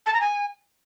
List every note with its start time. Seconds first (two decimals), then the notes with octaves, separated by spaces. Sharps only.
0.06 A5
0.14 A#5
0.21 G#5